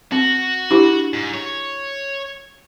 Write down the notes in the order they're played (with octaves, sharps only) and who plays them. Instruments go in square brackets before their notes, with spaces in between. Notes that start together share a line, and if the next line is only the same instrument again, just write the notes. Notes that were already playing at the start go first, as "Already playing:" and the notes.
[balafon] C4 [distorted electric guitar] F#4
[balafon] D4 E4 G4
[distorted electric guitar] G#2
C#5